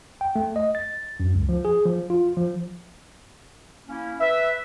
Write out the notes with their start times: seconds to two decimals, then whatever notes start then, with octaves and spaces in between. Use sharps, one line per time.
0.21 G5
0.36 A3
0.56 D#5
0.75 A6
1.20 F#2
1.35 C#2
1.49 F3
1.65 G#4
1.85 F3
2.10 F4
2.37 F3
3.89 A#3 C#4 E4
4.20 B4 E5